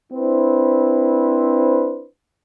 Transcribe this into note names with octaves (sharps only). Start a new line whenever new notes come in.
C4 D4 E4 B4 C5